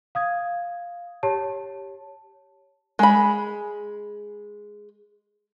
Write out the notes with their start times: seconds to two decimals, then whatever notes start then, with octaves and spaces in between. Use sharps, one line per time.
0.15 F5 D#6 G#6
1.23 G4 C#5 A5
2.99 G#3 B5